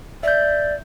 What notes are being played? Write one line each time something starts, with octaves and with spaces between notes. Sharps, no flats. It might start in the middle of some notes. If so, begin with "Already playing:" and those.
D5 E5 G6